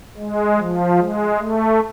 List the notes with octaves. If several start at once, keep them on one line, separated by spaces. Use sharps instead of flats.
G#3
F3
G#3
A3